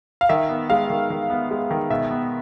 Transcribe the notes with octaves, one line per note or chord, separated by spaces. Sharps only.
F5
D#3 E5
B3
G#3 F5
D#3
D#3
B3
G#3
D#3
B2 E5
B3